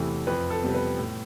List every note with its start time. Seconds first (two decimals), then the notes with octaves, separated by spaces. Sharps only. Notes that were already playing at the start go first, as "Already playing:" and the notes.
Already playing: E2 C3 E3 A3
0.27 F2 B4
0.50 A4
0.63 C3 G3 B3
0.75 B4
0.98 A2